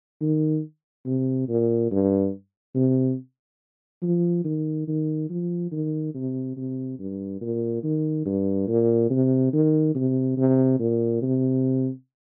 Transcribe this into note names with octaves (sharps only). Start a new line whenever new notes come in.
D#3
C3
A#2
G2
C3
F3
D#3
D#3
F3
D#3
C3
C3
G2
A#2
D#3
G2
A#2
C3
D#3
C3
C3
A#2
C3